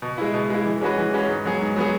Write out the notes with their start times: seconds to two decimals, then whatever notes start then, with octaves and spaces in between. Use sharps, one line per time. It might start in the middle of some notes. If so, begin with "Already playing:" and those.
0.02 B2
0.18 G#3 E4
0.34 B2
0.50 G#3 E4
0.66 E3
0.81 G#3 C#4 F#4 B4
0.98 E3
1.14 G#3 C#4 F#4 B4
1.29 G#2
1.45 F#3 B3 G#4
1.61 G#2
1.76 F#3 B3 G#4